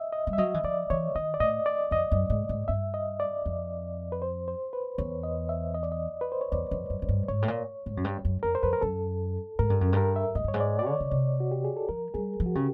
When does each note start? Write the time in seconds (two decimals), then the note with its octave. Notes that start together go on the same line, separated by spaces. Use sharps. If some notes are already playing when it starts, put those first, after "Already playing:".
Already playing: D#5 E5
0.13 D#5
0.27 G3
0.33 E5
0.38 F#3 D#5
0.54 E3
0.63 F3 D5
0.90 E3 C#5
1.15 D#3 D#5
1.34 D5
1.40 A2 D#5
1.66 D5
1.91 F2 D#5
2.12 F#2
2.30 G#2
2.49 G#2
2.68 G2 E5
2.94 D#5
3.20 D5
3.46 F2
4.12 B4
4.22 C5
4.48 C5
4.73 B4
4.98 E2 C#5
5.23 D#5
5.49 E5
5.74 D#5
5.83 D5
5.92 D#5
6.21 B4
6.32 C5
6.41 C#5
6.52 E2 D5
6.71 F2
6.90 F#2
7.02 F#2
7.09 G2
7.28 G#2 C#5
7.42 A2
7.48 A#2
7.86 G#2
7.97 F#2
8.04 G2
8.25 F#2
8.43 F2 A#4
8.55 C5
8.63 F2 B4
8.73 A#4
8.81 F#2 A4
9.59 G#2 A#4
9.70 G2
9.81 F#2
9.93 G2 A#4
10.16 E5
10.35 G#2 D#5
10.44 G2 C#5
10.54 G#2
10.60 D5
10.79 D5
10.87 D3 C#5
11.00 C#3
11.11 C3
11.40 F#4
11.52 G4
11.65 G#4
11.77 A4
11.89 F3 A#4
12.14 G3 G#4
12.40 F3
12.46 F#4
12.55 C#3 G4